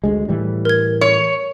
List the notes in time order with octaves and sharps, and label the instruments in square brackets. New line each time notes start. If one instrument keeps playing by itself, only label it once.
[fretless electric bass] D2 G#3
A2 E3 G3
[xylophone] A#4 G#6
[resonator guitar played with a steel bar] C#5